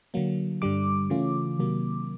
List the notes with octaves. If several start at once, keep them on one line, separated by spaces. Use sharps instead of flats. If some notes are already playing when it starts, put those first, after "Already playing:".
D3 F#3 A#3
G2 D3 G3 D6
C#3 E3 A3 C#4 F4
C3 D#3 F#3 A#3